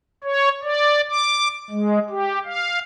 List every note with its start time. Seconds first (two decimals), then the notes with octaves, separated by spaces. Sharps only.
0.24 C#5
0.63 D5
1.09 D6
1.70 G#3
2.10 G4
2.45 F5